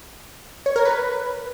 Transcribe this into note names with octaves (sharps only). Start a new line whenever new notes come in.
C#5
A#4
B4